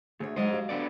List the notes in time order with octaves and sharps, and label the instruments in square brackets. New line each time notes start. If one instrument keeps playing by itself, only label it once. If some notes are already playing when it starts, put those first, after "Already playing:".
[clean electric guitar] D2 [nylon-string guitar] G#4 C#5
[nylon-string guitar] F#3 G#3 D#4 [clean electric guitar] C5 D#5
[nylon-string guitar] F#4 G4 F5
[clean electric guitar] D3 B3 D5